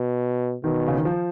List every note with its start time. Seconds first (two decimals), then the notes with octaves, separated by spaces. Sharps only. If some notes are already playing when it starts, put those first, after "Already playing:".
Already playing: B2
0.64 B2 D#3
0.88 C#3
0.97 D#3
1.05 F3